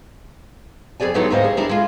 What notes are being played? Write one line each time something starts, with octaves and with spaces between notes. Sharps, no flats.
F2 E3 G#4 D5 G#5
E3 F#3 G#3 A3 B3 D#4
D2 G#2 C3 A#3 C5 D#5
G#4
D4 E4 A#4
G#3 F4